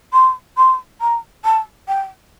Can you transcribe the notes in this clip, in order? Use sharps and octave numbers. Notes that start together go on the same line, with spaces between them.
C6
C6
A#5
A5
G5